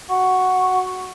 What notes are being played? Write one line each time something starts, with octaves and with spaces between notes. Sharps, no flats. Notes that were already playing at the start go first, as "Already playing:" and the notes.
F#4 F#5 C#6